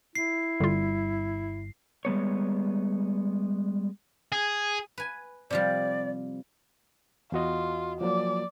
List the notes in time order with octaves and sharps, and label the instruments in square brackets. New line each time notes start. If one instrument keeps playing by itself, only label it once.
[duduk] E4 [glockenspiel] C7
[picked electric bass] G1 G3 [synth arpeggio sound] D3 F4
[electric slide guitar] G3 G#3 B3 C#5
[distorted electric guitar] G#4
[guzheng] B4 G#5
[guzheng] C3 F3 G3 [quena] D5
[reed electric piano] E2 F#4 D#5 [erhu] F4
[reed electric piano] F3 F#3 A#3 [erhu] D5